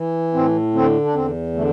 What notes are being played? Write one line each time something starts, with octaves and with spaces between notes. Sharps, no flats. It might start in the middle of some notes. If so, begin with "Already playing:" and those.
Already playing: E3
A2 C4
D3 C4
D4
E2 C4
D3 A3